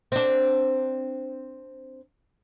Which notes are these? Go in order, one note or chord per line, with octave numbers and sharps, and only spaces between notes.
C4 D4